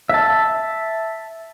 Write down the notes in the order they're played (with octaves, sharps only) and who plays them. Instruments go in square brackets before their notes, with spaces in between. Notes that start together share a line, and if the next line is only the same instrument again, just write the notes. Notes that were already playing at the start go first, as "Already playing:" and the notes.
[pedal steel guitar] E5 A5